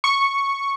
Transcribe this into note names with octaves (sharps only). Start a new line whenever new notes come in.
C#6